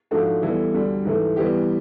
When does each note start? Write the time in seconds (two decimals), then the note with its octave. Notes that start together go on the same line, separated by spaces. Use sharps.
0.11 G#2 F3 A3 D4 F#4
0.42 E3 G3 B3 E4 A4
0.74 D2 D3 G3
1.05 G#2 E3 A3
1.36 E3 G3 B3 E4 G4